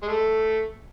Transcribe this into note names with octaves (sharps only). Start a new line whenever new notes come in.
G#3
A3